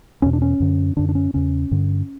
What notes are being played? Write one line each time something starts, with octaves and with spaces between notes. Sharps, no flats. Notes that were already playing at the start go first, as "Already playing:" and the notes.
E2 B2 C#4
D4
C#4
F#2 D3
F#2 D3 D4
D4
C#4
E2 C#3 C#4
G2 D3